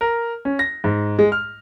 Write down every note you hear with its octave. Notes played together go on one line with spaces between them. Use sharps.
A#4
C#4
A#6
G#2
G#3
F6